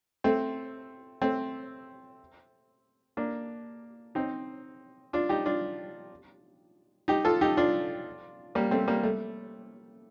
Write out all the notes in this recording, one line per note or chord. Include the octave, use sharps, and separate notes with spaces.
A3 C4
A3 C4
A#3 D4
C4 D#4
D4 F4
D#4 G4
D4 F4
D#4 G4
F4 A4
D#4 G4
D4 F4
G3 A#3
A3 C4
G3 A#3
A3